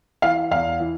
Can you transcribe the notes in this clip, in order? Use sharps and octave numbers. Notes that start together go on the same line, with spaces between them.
E3 F5
E2 F5
E3